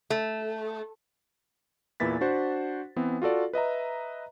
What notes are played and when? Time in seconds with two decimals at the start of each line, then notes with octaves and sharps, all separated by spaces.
0.10 A3
2.00 E2 A#2 E3 E4 A6 B6
2.21 D4 F#4 C5 F#5
2.96 E3 B3 C4
3.22 F4 F#4 A4 D5
3.53 B4 D#5 E5 A#5